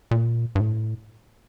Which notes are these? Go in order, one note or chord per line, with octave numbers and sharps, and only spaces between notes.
A#2
G2
A2